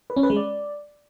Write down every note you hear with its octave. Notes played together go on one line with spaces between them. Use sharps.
B4
C#4
B4
G#3
D5